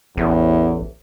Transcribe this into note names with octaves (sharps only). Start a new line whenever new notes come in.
A1 E2